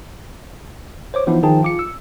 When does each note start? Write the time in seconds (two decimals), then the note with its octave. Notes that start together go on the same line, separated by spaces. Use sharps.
1.14 C5 C#5 D6
1.27 E3 F3 B3 D#4 E4
1.43 D#3 F3 D#4 G#4 G5 A5
1.63 F4 D6 C#7
1.79 E6